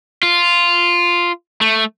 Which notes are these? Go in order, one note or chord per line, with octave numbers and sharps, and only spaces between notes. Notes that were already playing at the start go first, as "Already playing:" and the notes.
F4
A3